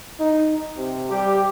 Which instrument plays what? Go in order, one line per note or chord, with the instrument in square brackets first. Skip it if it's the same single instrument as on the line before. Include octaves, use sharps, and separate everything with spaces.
[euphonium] D#4
C3
[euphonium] G3 [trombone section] G4